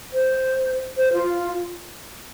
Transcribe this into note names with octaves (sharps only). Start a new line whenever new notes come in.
C5
C5
F4